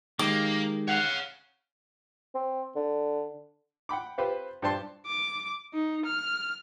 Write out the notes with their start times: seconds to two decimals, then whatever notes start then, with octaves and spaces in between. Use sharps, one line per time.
0.19 D#3 G#3 A#3 G4 D6
0.88 C#5 F5 F#5
2.35 C4
2.76 D3
3.89 F#5 G5 B5 D6
4.18 C4 F4 G4 B4 C5
4.62 G2 G4 C5 D5 A5 C6
5.07 D6
5.74 D#4
6.06 F6